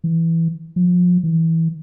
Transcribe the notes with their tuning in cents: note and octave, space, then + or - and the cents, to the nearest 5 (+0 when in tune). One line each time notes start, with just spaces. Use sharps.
E3 +0
F3 +30
E3 -15